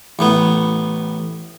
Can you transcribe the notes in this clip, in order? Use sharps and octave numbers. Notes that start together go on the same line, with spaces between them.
A1 A2 B3